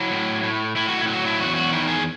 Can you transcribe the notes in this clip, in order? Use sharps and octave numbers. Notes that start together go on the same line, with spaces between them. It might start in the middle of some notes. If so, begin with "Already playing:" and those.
Already playing: F#3 E4
A2
A2
A2 E4
F#4
E4
F#3
F#4
E4
E2 F#4
F#4
D#3 E4
G#4